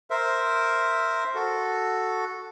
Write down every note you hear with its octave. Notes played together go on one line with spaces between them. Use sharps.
A#4 C5 E5
F#4 A4